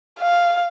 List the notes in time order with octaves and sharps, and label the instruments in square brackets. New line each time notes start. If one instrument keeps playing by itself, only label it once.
[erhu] F5